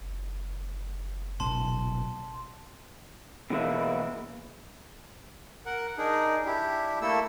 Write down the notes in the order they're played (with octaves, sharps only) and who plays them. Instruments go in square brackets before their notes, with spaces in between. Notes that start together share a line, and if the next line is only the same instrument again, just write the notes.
[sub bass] F#1
[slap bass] B1 A#2 C#3 [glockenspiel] A5 C6
[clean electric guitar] B2 E3 G#3 A#3 E4
[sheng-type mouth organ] A#4 F#5
D4 D#4 G#4 A#4
D4 E4 G4
A3 A#3 E4 A4 E6